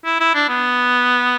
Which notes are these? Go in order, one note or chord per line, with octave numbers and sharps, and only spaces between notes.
E4
E4
D4
B3